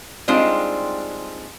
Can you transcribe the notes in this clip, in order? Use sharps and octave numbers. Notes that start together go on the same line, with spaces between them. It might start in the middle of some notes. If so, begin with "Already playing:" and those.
G3 G#3 C4 D4 D#4 F4